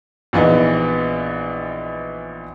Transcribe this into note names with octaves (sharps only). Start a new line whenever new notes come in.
A#1 E3 B3 D#4